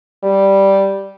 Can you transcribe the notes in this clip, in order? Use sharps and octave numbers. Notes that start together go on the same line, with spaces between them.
G3